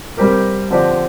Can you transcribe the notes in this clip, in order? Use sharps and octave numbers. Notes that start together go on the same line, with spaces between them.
C3 G3 C4 G4 A#4
D3 F3 C4 G4 D5